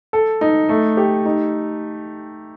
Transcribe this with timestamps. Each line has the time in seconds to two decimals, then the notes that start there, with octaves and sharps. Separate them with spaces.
0.13 A4
0.41 D#4
0.69 A3
0.97 G4
1.25 D#4